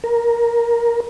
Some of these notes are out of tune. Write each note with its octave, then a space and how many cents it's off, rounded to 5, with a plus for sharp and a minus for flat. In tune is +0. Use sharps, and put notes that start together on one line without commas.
A#4 +10